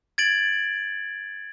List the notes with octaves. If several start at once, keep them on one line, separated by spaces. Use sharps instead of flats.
G#6 A6 D7 F#7